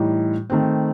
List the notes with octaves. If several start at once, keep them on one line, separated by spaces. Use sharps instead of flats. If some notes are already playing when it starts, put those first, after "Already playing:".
Already playing: A2 E3 G3 D#4
D#3 A3 C4